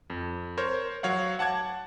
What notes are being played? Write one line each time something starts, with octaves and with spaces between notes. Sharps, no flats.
F2
A#4 C5 C#5
F#3 C#5 F5 F#5
F#5 A5 D6 G#6